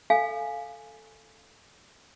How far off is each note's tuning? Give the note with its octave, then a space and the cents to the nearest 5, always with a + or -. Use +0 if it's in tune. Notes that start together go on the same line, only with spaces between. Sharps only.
A4 +0 F5 +0 G#5 +0